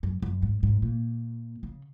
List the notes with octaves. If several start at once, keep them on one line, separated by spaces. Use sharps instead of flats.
F#2
F#2
G#2
G#2
A#2
C#3